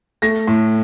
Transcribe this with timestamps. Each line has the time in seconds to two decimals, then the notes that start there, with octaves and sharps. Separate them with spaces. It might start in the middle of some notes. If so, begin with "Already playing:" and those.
0.22 A3 A#6
0.47 A2